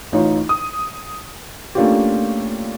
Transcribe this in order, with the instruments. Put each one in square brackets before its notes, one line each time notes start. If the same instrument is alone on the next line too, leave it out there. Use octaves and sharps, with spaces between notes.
[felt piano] A1 D#4 F4 C#5
D#6
A3 A#3 C#4 D4 F4 G4